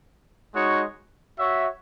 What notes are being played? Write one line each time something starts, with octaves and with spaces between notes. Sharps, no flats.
G#3 D#4 F#4 C#5
F#4 C#5 E5